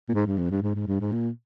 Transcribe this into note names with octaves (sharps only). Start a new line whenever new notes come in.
A#2
G#2
G2
F2
G2
G#2
G#2
G2
G#2
A#2